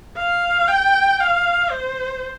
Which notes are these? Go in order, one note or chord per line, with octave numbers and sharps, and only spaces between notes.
F5
G5
F5
C5